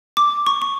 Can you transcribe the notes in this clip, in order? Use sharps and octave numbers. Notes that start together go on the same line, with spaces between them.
D6
C#6
C#6